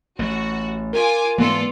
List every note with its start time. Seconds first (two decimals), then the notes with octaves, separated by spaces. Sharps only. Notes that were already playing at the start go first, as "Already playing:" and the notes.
0.19 A1 A3 F#4
0.93 F4 A#4 G#5 D6
1.38 G#2 E3 B3 F4 A4 D5